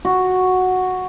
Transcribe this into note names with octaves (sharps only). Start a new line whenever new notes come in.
F#4